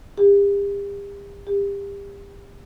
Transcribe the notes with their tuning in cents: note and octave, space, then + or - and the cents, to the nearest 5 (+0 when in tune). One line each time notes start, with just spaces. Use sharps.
G4 +40
G4 +30